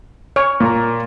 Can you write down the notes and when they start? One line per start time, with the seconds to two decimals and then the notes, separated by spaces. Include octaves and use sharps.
0.36 C#5 F6
0.60 A#2 A#4